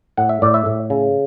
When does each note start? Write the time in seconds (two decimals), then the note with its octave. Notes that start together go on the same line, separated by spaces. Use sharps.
0.17 A2 F#5
0.29 E5
0.42 A2 D5
0.54 E5
0.66 A2
0.90 C#3